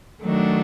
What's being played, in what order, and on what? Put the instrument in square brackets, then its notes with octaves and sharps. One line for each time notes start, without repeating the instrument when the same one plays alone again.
[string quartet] D#3 F#3 A3 D4 F#4